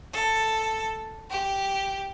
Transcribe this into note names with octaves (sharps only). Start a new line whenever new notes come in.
A4
G4